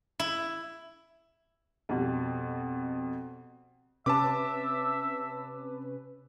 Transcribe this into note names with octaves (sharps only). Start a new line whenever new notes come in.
E4
F2 B2 G3
C3 C#4 B4 E5 A5 D6